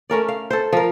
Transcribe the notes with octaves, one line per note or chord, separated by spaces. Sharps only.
A3 C#4 A#4 D5
F5
A4 C5
F3 A#4